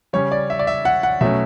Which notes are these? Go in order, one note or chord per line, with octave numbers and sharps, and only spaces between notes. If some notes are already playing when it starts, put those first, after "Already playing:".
C#3 G3 C#4 C#5
D5
E5
D5
E5
F#5
F#5
B2 F#3 A3 C#4 E5